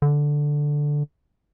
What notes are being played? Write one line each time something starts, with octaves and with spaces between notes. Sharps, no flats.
D3